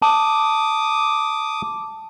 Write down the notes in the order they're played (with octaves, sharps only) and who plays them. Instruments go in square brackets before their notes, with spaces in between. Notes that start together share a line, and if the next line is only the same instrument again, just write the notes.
[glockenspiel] A5 [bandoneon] D6 D#6